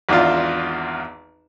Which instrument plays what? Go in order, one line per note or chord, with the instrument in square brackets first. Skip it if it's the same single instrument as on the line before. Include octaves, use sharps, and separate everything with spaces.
[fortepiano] G#1 E2 D4 F4